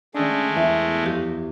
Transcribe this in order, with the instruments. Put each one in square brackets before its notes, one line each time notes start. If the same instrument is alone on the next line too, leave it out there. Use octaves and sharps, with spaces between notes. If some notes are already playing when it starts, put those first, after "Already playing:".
[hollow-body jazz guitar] D#3 C#4 D4 [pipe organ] G#3 A3
[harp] E2 [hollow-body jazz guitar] G#4 E5
[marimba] F#2 F3 G4